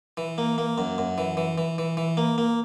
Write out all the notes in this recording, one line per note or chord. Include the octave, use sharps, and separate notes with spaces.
E3
A#3
A#3
F#2
F#2
E3
E3
E3
E3
E3
A#3
A#3